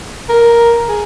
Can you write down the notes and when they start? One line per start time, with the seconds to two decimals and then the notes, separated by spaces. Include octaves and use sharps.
0.30 A#4
0.88 G#4